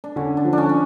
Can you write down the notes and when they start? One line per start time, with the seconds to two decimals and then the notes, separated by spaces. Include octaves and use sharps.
0.04 D4
0.16 D3 C#4
0.37 D4
0.45 F3
0.53 D4
0.58 C#4
0.69 C#4